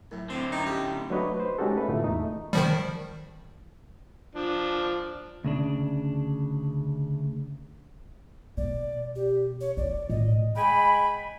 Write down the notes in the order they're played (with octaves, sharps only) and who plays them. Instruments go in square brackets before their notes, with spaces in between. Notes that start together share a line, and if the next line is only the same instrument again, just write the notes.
[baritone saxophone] A2 [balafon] F#3 A#4
[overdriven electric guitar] A2 D3 [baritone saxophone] C4
[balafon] C#4 G5 A#5 [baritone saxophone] D#4
[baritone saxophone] G3
[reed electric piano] F#3 A3 D4 B4 C#5 D#5
B4 C5
G#3 C#4 D#4 F#4 G4 A4
A3 B4
A2 D3 A3 F4
E2 A3 D#4
[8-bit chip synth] D#3 F3 G3
[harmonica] F3 D4
[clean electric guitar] D2 C#3 D4
[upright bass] B2 [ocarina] D5
[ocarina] G4
C#5
[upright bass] D4 [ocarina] D5
[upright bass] A2 [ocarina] D#5
[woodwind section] G#3 G5 G#5 B5